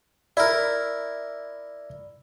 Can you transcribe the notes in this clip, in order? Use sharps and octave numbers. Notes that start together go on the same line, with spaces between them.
E4 A#4 D5